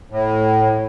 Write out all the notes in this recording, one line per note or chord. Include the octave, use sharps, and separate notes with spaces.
A2